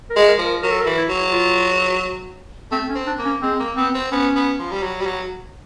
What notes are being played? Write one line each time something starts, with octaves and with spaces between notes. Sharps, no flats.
A#4
G#3
A#4
F3
A#4
F#3 A#4
A4
A#4
E3
E4
F#3
F4
A3 C4
C#4
C4
D4
A#3
C#4
G#3 C4
A#3
B3 C4
C4
B3 C#4
B3
F3
G3
F#3
G3
F#3